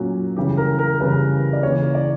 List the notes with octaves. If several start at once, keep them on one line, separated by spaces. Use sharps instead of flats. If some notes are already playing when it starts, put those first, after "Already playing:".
Already playing: A#2 F#3 A#3 C#4
C#3 E3 G3 C#4 G4
A#4
A#4
C#3 E3 G3 C#4 B4
D5
C#3 E3 A#3 C#5
D5